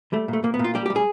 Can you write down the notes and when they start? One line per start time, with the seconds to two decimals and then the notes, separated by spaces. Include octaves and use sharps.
0.13 G3 A3
0.28 A#2
0.33 A3
0.44 A#2 A#3
0.54 B3
0.59 A#2
0.64 F4
0.75 G3 G4
0.86 G3 G4
0.96 G#4